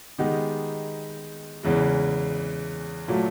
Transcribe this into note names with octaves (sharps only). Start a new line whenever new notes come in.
D#3 G#3 B3 D#4 G4
E2 C#3 E3 G#3
A#2 F#3 A3